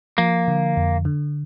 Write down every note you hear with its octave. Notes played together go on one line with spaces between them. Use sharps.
F3 A#3
D3
F2
D3